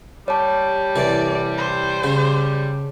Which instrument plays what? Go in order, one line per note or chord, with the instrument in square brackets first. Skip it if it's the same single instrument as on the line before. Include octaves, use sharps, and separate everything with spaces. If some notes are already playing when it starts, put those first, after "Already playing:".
[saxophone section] G3 [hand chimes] C#5 A5
[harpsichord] C2 E3 [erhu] D5
[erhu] C5
[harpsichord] C#3